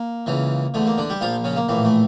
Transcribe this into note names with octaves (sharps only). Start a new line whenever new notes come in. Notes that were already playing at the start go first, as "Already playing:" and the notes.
Already playing: A#3
C#2 C#3 E3
E2 D3 A3
A#3
D3 D4
G3 G4
A#1 A#2 F3 F4
C#3 C#4
A#3
A#1 A2 E3 A#3
A3